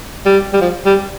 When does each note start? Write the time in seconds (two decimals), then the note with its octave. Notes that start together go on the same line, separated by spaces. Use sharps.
0.26 G3
0.53 G3
0.61 F3
0.86 G3